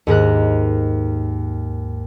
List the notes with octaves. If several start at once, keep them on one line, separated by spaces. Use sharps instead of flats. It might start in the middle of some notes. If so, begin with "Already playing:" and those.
D#2 G#2 A#4 F#6